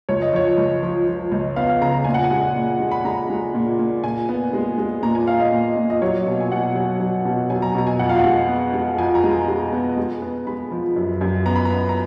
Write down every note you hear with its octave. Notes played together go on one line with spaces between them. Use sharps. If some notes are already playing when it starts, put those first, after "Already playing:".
C#2 C#5
D#5
F3 C#5
C#2
F3
F3
C#2
B3 F5
F5
C#3 A#5
A#5
A#2 G#5
F#5
G#5
G#3
A#2
G#3
B5
G#3 A#5
G#3
A#2
A#2
A#2 G#5
B3
G#3
G#3
A#2 A#5
G#5
A#2 F5
D#5
A#2
A#2
D#5
F#3 C#5
B2
G#5
B2 F#5
F#3
F#3
B2
F#3 G#5
A#5
B2 A#5
G#5
F2 F#5
F5
F#5
G#3
B3
G#3
F2 G#5
A#5
G#3
A#5
G#3
B3
G#3
B3
G#3 B5
F3
F#2
F#2
B3 A#5
B5
A#5
B3
A#5